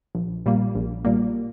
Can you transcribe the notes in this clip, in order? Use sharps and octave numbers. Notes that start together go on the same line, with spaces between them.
A#1
A#2 G3 A#3
A#1
A#2 G3 A#3